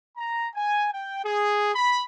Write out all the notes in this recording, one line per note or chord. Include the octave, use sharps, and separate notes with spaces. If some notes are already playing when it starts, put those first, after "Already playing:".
A#5
G#5
G5
G#4
B5